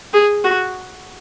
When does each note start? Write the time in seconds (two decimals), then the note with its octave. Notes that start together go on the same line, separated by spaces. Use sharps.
0.13 G#4
0.44 F#4